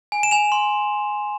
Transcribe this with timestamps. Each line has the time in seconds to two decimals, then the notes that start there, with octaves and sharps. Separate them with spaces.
0.12 G#5
0.23 E7
0.31 G#5 F7
0.52 C6